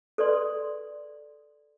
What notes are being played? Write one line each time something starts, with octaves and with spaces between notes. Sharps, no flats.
A4 B4 D5 C6